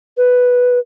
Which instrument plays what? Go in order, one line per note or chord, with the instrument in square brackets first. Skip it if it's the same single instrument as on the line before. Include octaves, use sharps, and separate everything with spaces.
[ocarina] B4